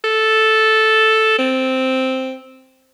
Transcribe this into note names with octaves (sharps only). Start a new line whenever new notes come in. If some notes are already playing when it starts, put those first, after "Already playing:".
A4
C4